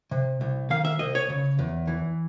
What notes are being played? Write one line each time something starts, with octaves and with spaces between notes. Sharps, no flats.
C3
C2
D#3 F5
E5
C2 D#5
C#5
C#3
E2
E3